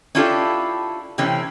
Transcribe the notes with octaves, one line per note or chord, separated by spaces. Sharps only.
C#4 D4 E4 F4 G4 A4
C3 E3 A3 C4 C#4